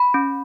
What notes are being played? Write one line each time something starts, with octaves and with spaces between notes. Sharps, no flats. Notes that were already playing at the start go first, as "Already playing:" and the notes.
Already playing: B5
C#4